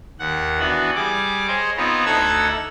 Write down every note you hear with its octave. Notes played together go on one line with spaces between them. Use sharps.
D#2 F#5
E3 B3 D4 F#4
G3 G#4 D6
G#4 C5 C#5 D#5
B3 C4 D#4 F4 B4 C#5
D2 D#4 A4 F#5 E6 G#6